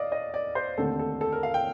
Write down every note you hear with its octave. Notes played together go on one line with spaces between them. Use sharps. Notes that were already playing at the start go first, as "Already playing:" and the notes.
Already playing: D5 D#5 F5
D#5
D5
C5
D#2 D3 A3 C4 A4
A4
A4
A#4
F5
G5